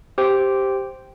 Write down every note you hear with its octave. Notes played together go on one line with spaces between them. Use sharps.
G4 C5 G5